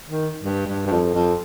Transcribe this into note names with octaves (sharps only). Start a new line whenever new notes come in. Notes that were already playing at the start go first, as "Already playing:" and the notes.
D#3
G2
G2
G2
F2
F2